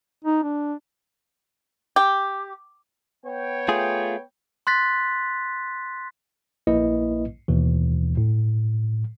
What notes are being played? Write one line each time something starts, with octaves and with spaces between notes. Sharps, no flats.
D#4
D4
G4
B3 C#5 G5
A3 F4 G#4
C6 F#6 A6 B6
A#1 A#3 E4 B4 D#5
D#2 B2 E3
A2